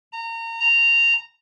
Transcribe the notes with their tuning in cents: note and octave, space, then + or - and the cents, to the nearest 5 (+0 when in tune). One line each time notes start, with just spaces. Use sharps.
A#5 -30
A#5 -15